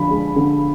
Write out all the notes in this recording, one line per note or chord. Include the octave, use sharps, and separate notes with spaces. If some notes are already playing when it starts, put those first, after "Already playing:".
Already playing: D3 F3 B5
G#3
D3